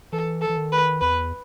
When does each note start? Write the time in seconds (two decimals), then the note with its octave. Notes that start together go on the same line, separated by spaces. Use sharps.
0.12 E3 A4
0.41 A4
0.49 E3
0.57 D#3
0.72 B4
1.01 E2 B4